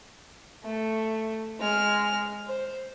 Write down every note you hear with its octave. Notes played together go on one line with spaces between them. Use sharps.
A3
G#3 F6
C5